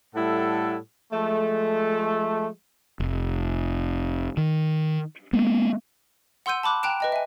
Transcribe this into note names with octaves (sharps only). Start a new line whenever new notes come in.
A2 G3 E4 A4 F#5
F3 G#3 A3
F1
D#3
G#3 A#3 B3
F#5 C6 E6 G6 D#7
A5 B5 D6 F#6
G5 A#5 F#6 D7 E7
B4 D#5 G5
E5 G#5